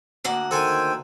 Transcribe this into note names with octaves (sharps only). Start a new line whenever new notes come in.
D2 A#3 F#5
D#3 A4 C5 G5 G#5